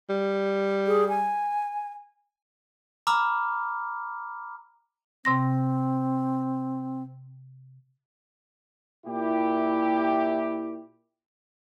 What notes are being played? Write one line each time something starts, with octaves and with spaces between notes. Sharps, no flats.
G3
G#4
G#5
A#5 B5 D6 E6 F6
C3 C4 C6 A#6
A#2 E4 G4